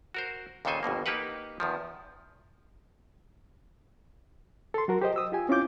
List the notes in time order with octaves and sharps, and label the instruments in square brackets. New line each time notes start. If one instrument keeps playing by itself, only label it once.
[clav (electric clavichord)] F#4 A#4 C5
D#2 A#2 C#3 A4 C5 G#5
G1 F2 B2 A#3
A#3 D#4 G4 B4 F#5
E2 D#3 F3
[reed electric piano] A4 C6
F#3 F#4 A#4
G4 C5 D#5
D#6 E6
F4 G4 G#5
C4 C#4 E4 F4 D6 G6